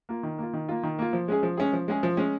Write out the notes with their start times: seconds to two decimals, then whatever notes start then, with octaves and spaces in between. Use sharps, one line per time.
0.09 A#3 F4
0.23 D#3
0.38 A#3 F4
0.53 D#3
0.69 A#3 F4
0.83 D#3
0.99 A#3 F4
1.13 F3
1.28 G#3 C#4 G#4
1.43 F3
1.57 G#3 C#4 G#4
1.73 F3
1.88 G#3 C#4 G#4
2.03 F3
2.17 G#3 C#4 G#4